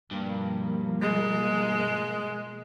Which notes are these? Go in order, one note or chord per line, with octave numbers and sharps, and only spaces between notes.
G2 B2 F3 A#3
G#3